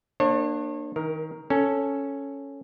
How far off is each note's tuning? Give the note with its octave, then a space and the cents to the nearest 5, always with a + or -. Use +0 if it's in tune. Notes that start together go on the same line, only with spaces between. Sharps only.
A#3 +0 D4 +20 C#5 -40
D#3 +30 A#4 +0
C#4 +0 A4 +0